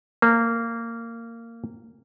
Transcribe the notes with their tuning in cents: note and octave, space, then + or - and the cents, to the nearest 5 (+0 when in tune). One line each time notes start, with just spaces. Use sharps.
A#3 -15